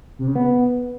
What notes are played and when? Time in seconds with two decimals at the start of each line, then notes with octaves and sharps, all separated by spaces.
0.19 C3
0.27 C#3
0.36 B3